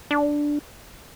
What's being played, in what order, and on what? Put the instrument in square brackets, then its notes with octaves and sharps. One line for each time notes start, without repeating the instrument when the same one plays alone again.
[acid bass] D4